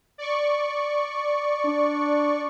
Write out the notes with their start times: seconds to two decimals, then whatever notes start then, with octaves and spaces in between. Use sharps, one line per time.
0.18 D5 C#6
1.64 D4